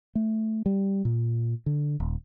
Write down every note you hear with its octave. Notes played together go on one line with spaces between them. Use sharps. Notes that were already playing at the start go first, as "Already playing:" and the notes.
A3
G3
A#2
D3
D#1